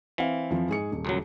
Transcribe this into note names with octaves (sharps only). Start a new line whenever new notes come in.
E3 C4 F5
F2 F3
G#2 G#4 C#7
D#1
C#2 F#2 F#3